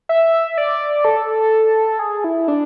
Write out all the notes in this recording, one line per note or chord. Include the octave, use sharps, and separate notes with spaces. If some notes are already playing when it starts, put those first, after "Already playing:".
E5
D5
A4
G#4
E4
D4